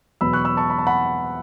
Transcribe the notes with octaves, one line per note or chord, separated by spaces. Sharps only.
E2 B2 F#3 B3 B5 E6
C#6 F#6
B5 E6
A5 C#6
B5
A5
F#5 B5